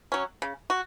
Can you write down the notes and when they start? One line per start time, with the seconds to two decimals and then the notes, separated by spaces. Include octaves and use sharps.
0.12 F#3 C#4
0.42 C#3
0.70 F#4